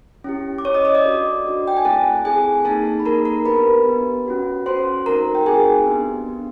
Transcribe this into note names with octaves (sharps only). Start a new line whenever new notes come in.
C#4 E4 G4
D6
C#4 E4 G4 C#5 C#6
D#5 D#6
D#5 D#6
D5 D6
D4 F#4 A4
D4 F#4 A4
G5
G#5
A3 C4 E4 A4 A5
A3 C4 E4 G#4 A4 G#5
A#3 D#4 G#4 A4 A5
B5
A#3 D#4 G#4 A#4 A#5
A#4 A#5
B3 D4 G4 B4 B5
B3 D4 G4
C#4 F#4 A4
C#4 F#4 A4 C5 C6
A3 C4 D#4 F#4 A4 A#4 A#5
G5
A3 C4 D#4 F#4 G#4 A4 G#5
B3 D4 G4
B3 D4 G4